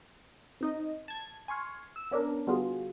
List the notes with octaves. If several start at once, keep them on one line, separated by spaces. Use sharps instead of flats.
C4 D#4 D#5
A5 G#6
G#5 C6 C#6 F6
E6
B3 C#4 D4 A#4
D3 G3 B3 F4 F#4 G#4